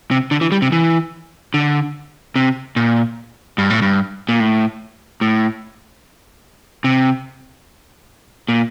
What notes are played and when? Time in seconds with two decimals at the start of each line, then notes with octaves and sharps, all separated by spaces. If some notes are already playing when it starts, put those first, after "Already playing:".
0.11 C3
0.31 D3
0.41 E3
0.52 G3
0.62 C3
0.72 E3
1.54 D3
2.36 C3
2.76 A#2
3.58 G2
3.70 A2
3.82 G2
4.29 A#2
4.40 A2
5.21 A2
6.84 C3
8.49 A#2